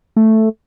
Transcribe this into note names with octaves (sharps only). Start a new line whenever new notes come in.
A3